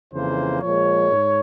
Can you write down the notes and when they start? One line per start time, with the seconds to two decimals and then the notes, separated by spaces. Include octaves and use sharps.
0.13 F2 C#3 E3 A#3 C5
0.62 A#2 F3 G#3 C#5
1.11 G#2